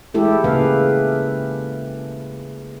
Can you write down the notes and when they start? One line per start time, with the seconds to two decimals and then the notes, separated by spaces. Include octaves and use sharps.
0.14 G#3 A3 E4 G4 A4
0.44 C#3 A3 A#3 G#4 B4 F5